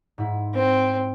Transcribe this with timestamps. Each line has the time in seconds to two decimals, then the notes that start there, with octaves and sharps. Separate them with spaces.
0.18 G#2 E4
0.54 C4